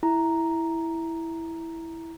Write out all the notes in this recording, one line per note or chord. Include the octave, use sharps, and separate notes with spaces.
E4 A#5